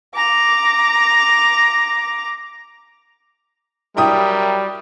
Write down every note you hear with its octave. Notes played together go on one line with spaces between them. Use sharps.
A#5 D6
F#3 G3 E4 A#4 E5 G5 D#6